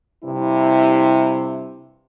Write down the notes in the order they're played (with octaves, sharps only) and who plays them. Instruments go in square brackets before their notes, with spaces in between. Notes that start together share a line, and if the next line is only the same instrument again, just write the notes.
[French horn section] G2 C3 E4